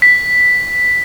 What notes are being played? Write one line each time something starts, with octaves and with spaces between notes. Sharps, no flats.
B6